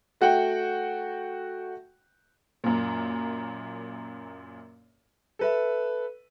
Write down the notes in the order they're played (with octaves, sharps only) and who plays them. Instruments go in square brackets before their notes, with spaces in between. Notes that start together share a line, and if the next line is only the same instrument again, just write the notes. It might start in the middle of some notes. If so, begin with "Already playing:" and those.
[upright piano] A3 F#4 F#5 G5
[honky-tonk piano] F#2 A#2
[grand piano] A4 B4 E5